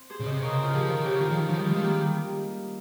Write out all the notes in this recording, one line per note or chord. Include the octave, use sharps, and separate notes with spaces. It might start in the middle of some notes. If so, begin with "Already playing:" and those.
Already playing: C4
G#4 C5
C#3
C3 C5 D#5
C#3 A#4 C#5
G#4 C5
F4 G#4
F3 G4 A#4
D#3
C#3 G4 A#4
D#3 F4 G#4
F3
D#3 D#4 G4
F3 C#4 F4
D#3 G3
F3 G#3
D#3
G3 A#3
G3